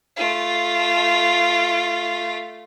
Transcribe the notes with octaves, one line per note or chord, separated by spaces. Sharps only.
A3 F4